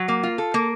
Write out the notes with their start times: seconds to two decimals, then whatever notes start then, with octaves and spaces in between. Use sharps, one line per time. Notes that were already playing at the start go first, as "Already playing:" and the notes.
Already playing: F#3
0.08 A#3
0.23 F4
0.38 A4
0.54 A#3